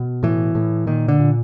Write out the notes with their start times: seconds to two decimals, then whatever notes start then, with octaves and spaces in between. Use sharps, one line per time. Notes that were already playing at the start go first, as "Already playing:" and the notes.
Already playing: B2
0.23 A2 E3
0.55 A2
0.87 A#2 D#3
1.08 D3
1.20 A#2